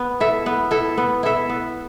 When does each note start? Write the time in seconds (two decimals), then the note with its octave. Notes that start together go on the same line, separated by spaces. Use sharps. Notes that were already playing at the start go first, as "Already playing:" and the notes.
Already playing: B3
0.20 E4 A4 E5
0.46 B3
0.71 E4 A4 E5
0.98 B3
1.23 E4 A4 E5
1.49 B3